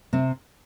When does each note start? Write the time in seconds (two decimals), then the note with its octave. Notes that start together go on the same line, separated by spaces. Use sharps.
0.13 C3 C4